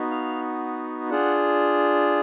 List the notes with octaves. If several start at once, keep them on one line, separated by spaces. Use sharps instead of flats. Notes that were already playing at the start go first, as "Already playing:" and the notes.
Already playing: B3 D#4 F#4
F5
D4 F4 G#4 F#5